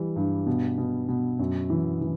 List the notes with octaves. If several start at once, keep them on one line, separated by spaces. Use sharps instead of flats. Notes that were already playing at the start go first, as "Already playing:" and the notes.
Already playing: E3 G3
G2
B2
B2
B2
F#2
E3
E3